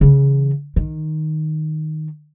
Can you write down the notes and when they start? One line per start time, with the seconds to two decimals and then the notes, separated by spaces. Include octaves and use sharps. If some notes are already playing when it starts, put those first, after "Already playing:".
0.01 C#3 E3
0.76 D#3